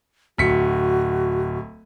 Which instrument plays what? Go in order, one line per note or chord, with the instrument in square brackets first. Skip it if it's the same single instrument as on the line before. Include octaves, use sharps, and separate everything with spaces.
[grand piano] D1 B6 C#7 [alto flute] F#4